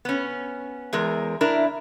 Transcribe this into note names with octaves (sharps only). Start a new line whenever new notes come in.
B3 C#4
E2 G#3 A#4
D4 E4 A#4